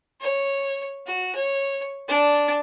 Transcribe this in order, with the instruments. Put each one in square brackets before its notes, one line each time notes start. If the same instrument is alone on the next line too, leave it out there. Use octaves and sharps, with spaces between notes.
[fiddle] C#5
F#4
C#5
D4